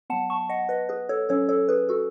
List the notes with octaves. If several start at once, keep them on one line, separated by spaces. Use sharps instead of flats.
F#3 B3 F#5 A5
A5 C#6
D#5 F#5
B4 D#5
G#4 B4
A4 C#5
F#3 C#4 A4 C#5
A4 C#5
G#4 B4
F#4 A4